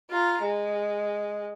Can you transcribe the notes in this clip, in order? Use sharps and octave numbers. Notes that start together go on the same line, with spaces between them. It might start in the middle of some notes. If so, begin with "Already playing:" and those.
F4 A#5
G#3